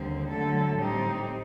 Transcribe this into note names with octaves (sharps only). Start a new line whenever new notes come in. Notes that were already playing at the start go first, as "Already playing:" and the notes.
Already playing: D#2 D3 G3 C4
D3 F#3 A3 A4
A2 G3 C4 D#4 G4